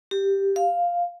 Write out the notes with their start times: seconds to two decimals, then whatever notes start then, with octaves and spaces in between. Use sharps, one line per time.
0.11 G4
0.56 F5